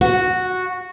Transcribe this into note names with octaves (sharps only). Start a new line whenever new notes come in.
F#4